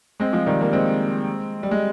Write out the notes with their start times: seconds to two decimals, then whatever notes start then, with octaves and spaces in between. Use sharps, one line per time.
0.20 G#3 C4
0.33 F3 G#3
0.46 D#3 G3
0.61 G3 A#3
0.73 G#3 C4
1.63 G3
1.71 G#3